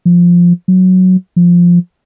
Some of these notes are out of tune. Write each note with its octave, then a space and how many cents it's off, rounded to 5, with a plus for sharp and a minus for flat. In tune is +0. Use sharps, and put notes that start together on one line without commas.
F3 +0
F#3 +0
F3 +0